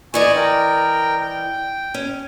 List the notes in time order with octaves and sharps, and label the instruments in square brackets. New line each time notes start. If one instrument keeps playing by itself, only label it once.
[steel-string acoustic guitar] E3 D5 D#5 [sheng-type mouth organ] G#5 C#6
[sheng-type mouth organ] A#4 G5
G5
[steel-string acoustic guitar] C#4